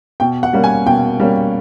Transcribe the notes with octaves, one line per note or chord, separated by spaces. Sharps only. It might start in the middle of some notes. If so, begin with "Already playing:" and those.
B2 G5
F#5
G3 A#3 C#4
G#5
B2 G5
G3 A#3 C#4